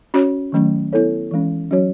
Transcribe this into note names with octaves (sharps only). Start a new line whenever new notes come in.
C#4 F#4 C#5
D#3 F#3 A3 C#4
B3 E4 A4 C#5
E3 G#3 C#4
F#3 C#4 F#4 C#5